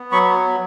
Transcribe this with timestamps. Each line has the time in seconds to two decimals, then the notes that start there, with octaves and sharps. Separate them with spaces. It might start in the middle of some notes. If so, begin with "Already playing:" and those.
Already playing: B3
0.12 F#3 B5 C#6